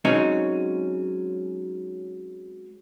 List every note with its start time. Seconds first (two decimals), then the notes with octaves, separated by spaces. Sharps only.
0.05 F#3 G#3 C4 C#4 D#4 C#5